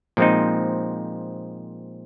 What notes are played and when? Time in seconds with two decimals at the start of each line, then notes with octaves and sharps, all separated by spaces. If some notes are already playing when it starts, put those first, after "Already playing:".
0.17 A#2 F3 G#3 C4 D#4